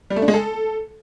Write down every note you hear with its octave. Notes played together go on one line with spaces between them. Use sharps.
G3
A3
D4
G#3
A4